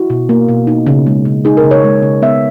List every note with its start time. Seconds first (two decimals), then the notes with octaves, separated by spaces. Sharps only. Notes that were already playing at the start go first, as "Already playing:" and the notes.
Already playing: E4 F#4
0.10 B2
0.29 A#3
0.49 B2
0.67 D#4
0.87 C#3
1.07 G#3
1.25 C#3
1.45 D#4 G#4
1.57 A#4
1.64 C#3
1.71 C#5
1.84 G#3
2.02 C#3
2.22 B3 E5